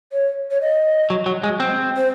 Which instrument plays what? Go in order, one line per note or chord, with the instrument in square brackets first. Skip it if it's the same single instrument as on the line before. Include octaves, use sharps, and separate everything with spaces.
[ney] C#5
C#5
D#5
[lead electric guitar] F#3
F#3
G#3
C4
[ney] C5